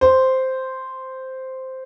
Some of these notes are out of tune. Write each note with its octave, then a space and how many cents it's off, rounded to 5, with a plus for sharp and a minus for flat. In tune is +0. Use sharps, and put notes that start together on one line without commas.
C5 -5